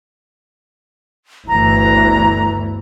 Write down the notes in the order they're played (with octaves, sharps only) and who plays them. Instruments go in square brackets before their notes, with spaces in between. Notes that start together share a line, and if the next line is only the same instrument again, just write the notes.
[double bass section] G1 D2 E3 [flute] A#5